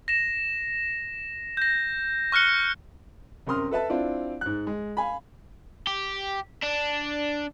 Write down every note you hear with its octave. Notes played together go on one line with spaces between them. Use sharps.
A#6 E7
G6 A#6
C#6 F6 F#6 C#7 G7
C2 F#2 A#4 C6 D#6 F6
A4 B4 E5 A5
C4 D4 E4 F4 D5
G#2 F#6
G#3
F5 G#5 B5
G4
D4